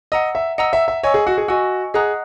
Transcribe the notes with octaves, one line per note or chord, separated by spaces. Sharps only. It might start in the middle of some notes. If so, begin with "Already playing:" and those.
D#5 F#5 A#5 E6
E5
D#5 F#5 A#5 E6
E5
E5
C#5 D#5 G#5 C#6 E6
G#4
F#4
G#4
F#4 D#5 G#5 C#6 E6
G#4 D#5 F#5 A#5 D#6 F#6